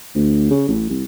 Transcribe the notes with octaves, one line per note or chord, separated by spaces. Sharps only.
D2
C#3
A1
C2